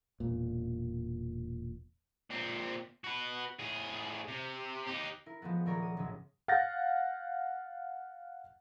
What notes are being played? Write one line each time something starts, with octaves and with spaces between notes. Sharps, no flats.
E1 A#2
A#2 C4
F#4 B4
A2 G#4
C3
D#4 G4
E4 A#4
F3 G#3 A3 B3
D#1 F#3 A#4 C#5 D5 A#5
D#6
G#1 C#3 F#3 C#4
F5 F#5 G6 A6 A#6